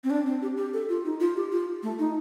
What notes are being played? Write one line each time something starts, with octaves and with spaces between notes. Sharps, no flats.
C4
D4
C4
G4
G4
A4
F4
D#4
F4
G4
F4
A3
D#4